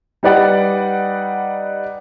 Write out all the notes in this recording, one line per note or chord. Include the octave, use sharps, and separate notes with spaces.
G3 D#4 B4 D5 F#5